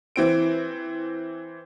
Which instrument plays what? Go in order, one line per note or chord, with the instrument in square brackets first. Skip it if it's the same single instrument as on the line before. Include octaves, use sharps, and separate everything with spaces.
[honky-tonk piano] E3 C4 D7